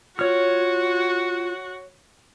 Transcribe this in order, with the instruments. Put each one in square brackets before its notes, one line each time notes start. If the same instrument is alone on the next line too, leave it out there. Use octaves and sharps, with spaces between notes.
[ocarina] F4 [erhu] F#4 [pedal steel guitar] C#5 F6